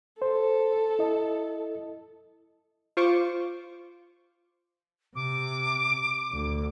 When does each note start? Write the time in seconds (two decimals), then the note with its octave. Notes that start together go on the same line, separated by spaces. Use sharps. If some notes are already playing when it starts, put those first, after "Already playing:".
0.22 A4 C5
0.99 E4 D#5
2.97 F4 C5 C#6 D6
5.15 C3 D6
6.32 D2